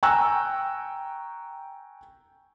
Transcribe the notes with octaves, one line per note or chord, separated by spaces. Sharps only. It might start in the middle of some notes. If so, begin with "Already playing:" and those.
G5 G#5 A#5 C#6 E6 F#6